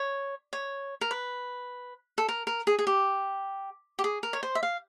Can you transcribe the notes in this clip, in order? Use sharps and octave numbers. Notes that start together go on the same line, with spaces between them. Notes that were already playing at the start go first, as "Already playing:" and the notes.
Already playing: C#5
C#5
A#4
B4
A4
A#4
A#4
G#4
G#4
G4
G4
G#4
A#4
C#5
C5
E5
F5